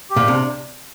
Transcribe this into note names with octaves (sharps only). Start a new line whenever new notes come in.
G4
A#2
C3 D4